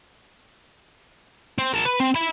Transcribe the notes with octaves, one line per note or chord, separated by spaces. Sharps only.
C4
A#4 A5
B4
C4
E5 B5